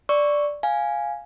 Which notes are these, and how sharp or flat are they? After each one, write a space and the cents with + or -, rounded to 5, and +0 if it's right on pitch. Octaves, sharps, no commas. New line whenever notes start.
D5 +0 C#6 +0 E6 +0
F5 +0 G#5 +0